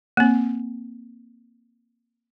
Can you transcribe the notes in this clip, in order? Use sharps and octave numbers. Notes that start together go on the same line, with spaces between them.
A#3 C4